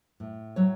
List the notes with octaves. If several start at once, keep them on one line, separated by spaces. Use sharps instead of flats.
A2
F#3 C#5